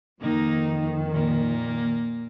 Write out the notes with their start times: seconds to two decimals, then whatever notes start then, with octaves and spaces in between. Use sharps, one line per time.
0.20 F2 D#3 A#3 D#4
1.11 A#2 A#3